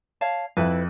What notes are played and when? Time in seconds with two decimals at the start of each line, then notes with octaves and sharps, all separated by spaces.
0.21 C#5 F5 A5
0.57 F2 E4 B4